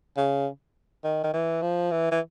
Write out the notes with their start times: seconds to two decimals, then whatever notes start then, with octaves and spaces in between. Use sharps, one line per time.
0.17 C#3
1.04 D#3
1.24 D#3
1.33 E3
1.62 F3
1.91 E3
2.11 E3